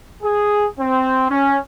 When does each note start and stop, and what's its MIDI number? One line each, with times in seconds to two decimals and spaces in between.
0.23 0.66 68
0.79 1.26 60
1.30 1.57 61